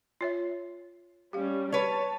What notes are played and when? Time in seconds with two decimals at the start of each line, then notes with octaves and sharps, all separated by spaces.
0.21 F4 C#5 E5
1.33 G3 C#4 G4 F5
1.72 B4 C#5 A5